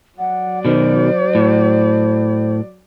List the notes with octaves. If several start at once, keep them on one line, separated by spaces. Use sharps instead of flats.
F#3 D5 F#5
B2 D#3 C5
A2